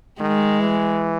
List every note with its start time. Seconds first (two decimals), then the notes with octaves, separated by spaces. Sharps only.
0.20 D#3 G#3
0.60 E3